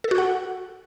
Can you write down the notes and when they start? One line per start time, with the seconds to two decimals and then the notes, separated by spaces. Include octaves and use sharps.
0.04 A4
0.11 F#4
0.18 F#5